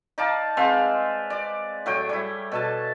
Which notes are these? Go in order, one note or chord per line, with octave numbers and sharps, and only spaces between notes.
D#4 D5 F5 A5
G#3 C4 B4 F5
D5
A2 F#3 C#5 G5
G3 E4
B2 A4 A5